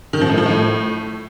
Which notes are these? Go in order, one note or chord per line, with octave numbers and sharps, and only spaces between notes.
D#3
F3
A2
F3
A2